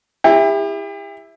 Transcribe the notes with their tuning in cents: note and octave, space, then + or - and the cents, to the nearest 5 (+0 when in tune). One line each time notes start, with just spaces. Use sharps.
E4 +0 G4 +40